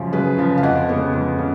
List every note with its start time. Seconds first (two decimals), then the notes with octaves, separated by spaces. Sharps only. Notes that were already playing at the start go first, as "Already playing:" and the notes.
Already playing: F#2 C#3 F3
0.13 F#2 G#4 B4
0.38 C#3 F3
0.58 F5
0.63 F2 D#5 F#5
0.89 C#3 G#3 B3
1.13 F2
1.39 C#3